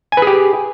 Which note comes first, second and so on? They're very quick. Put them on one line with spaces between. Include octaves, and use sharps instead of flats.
G#5 B4 G#4 G4